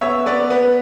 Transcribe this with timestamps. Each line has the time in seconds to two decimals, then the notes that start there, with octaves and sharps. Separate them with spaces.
0.01 B3 C#5 E5
0.26 B3 B4 D5
0.50 B3 B4